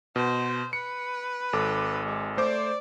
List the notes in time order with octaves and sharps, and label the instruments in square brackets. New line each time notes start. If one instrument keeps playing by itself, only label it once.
[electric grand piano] B2 [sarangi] C5
[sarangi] B4 [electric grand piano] C#7
[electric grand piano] G#1 A4 D6
[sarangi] G#3
[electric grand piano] A3 C5 D6 [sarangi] D5